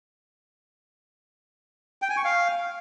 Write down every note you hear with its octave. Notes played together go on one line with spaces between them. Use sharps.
G5
G#5
C#6
F5